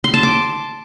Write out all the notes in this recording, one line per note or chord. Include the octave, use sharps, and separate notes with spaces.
C6
A5
D6